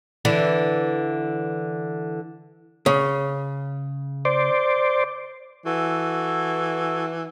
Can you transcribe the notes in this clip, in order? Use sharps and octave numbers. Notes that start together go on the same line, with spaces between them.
D3 E3
C#3
C5 D5
E3 F#4 A4